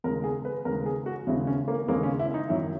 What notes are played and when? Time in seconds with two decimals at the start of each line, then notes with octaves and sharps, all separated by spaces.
0.04 D#2 C#3 G#3 A#4
0.24 G#4
0.45 B4
0.65 D#2 C#3 G#3 A#4
0.86 G#4
1.06 F#4
1.27 D#2 C#3 G#3 E4
1.47 C#4
1.68 A#3
1.88 D#2 C#3 G#3 A#3
2.03 C#4
2.19 E4
2.34 D#4
2.49 F#2 D#3 F#3 E4